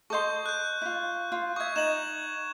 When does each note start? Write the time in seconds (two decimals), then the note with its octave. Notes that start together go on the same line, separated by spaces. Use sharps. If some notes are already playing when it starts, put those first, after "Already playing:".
0.10 A4 D#5 C6 C#6 G6
0.46 F#6 G6
0.82 E4 F4
1.32 F4
1.56 E5 C#6 D#6 G#6
1.76 D#4 E7 F#7